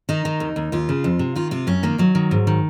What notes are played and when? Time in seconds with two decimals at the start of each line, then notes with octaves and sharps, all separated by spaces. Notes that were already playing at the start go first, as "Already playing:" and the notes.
0.09 D#3 D#4
0.25 D#3
0.40 D#2
0.56 D#2
0.72 D#2 F4
0.89 C#3
1.04 F2
1.19 C3
1.35 D#3 F4
1.51 C3 F4
1.67 F#2 C#4
1.83 D#3 A#3
1.98 D#3 F#3
2.15 D#3
2.31 G#2
2.47 D#3